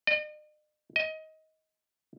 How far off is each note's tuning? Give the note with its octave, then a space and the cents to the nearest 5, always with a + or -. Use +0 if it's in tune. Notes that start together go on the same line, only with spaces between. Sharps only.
D#5 -45
D#5 +20